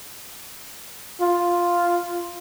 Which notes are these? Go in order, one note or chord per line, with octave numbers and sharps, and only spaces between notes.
F4